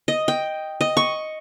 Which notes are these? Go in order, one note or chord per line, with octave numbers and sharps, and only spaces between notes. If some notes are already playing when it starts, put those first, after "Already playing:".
D#5
G5
D#5
C#6